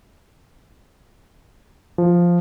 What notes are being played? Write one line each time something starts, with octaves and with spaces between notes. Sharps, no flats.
F3